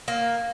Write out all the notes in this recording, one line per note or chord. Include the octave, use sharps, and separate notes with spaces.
A#3